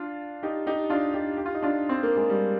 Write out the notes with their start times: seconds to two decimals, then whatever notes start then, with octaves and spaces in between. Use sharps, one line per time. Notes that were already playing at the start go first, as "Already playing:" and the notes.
Already playing: D4 F4
0.43 D#4 G4
0.67 D#4 G4
0.90 D4 F4
1.14 D#4 G4
1.37 G4
1.45 F4
1.54 D#4
1.62 D4 F4
1.89 C4
2.03 A#3
2.16 G#3
2.30 G3